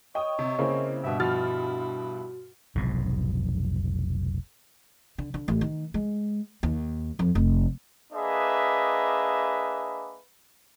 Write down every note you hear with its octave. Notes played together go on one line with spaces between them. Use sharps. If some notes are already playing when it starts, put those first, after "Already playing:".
C#5 D#5 G5 D#6
C3
C#3 A#3 C4 E4
G2 B2 E5
F3 E4 F#4 F6 A6
F1 B1 F2 G#2
D3
D3
A1
D#3
G#3
D#2
F2
F1
A#3 D4 G#4 B4 D#5 E5